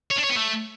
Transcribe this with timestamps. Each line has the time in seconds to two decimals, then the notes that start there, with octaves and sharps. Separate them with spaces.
0.10 C#5
0.17 D4
0.23 C#5
0.30 B3
0.36 A3